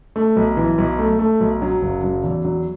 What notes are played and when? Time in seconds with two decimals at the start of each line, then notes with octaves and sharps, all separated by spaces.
0.16 A3
0.36 B1
0.57 E3
0.78 B1
0.99 A3
1.19 A3
1.41 B1
1.62 F#3
1.82 F#1
2.04 F#3
2.24 E2
2.45 F#3